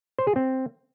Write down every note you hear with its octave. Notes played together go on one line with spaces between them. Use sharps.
C5
G#4
C4